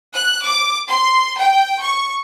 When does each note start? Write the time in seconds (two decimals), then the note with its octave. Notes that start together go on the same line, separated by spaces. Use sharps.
0.14 F#6
0.45 D6
0.88 C6
1.38 G5
1.82 C#6